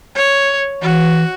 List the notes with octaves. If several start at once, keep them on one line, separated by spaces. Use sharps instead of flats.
C#5
E3 F#4